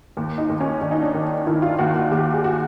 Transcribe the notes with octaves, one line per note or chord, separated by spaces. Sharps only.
D#2
D#4
D#2
C#4
D#2 D4
D#4
D4
D#3
D#3 E4
F4
D#2 F#4
F#4
D#2 G4
G#4
F#4